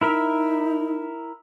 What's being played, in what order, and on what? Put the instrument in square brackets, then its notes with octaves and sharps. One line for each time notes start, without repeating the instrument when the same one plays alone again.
[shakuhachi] D#4 [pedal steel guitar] E4 A#4 E5